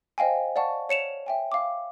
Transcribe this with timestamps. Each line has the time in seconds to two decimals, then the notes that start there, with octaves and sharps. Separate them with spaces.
0.18 C5 D#5 F5 G5 G#5
0.56 D5 F5 F#5 A5 C#6
0.89 C#5 C#7 E7 F7
1.26 E5 G5 G#5
1.52 F5 D6